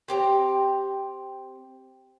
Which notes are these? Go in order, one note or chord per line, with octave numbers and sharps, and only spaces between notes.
C4 G4 A#5